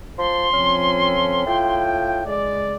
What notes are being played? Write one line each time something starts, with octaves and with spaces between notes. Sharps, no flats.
F3 C6
F3 C4 C#4 A4
A2 F4 G5
C#2 G#3 D5